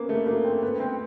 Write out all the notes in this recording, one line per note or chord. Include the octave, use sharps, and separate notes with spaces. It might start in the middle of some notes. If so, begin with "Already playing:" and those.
Already playing: A#3 B3 C#4
A3
A#3
C4
B3
C4